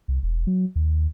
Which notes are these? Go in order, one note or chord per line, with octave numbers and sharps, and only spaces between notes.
C2
E1
F#3
D#2